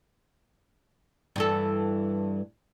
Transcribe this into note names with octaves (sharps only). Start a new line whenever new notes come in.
G2 E3 A4